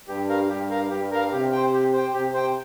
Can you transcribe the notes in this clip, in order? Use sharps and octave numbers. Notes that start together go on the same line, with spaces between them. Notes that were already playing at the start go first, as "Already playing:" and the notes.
G2 G4
A#4 F5
G2 G4
A#4 F5
G2 G4
A#4 F5
C3 G4
C5 G5
G4
C5 G5
C3 G4
C5 G5